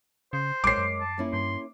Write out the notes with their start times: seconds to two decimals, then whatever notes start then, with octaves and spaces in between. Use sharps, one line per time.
0.33 C#3 C5
0.64 A#1 G#3 A#4 C#5 D6 C7
0.78 F#2
1.01 A5
1.18 A#3 C#4 E4
1.33 G2 C6